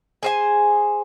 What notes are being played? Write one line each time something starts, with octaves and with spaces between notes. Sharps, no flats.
G#4 C5 G#5